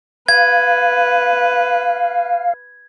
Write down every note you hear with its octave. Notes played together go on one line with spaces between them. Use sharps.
B4 F5 G#6